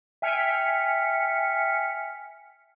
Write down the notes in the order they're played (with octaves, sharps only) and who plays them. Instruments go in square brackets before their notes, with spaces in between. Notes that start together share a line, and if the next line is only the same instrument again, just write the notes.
[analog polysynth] E5 G5 G#5 F6 B6 C#7